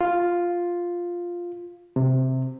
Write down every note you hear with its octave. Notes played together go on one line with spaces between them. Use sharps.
F4
C3